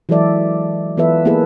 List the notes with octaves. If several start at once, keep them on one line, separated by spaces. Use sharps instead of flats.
E3 F#3 G#3 A4 D5 E5
E3 B3 F4 A4 B4 E5
A#3 B3 E4 G#4 A4 B4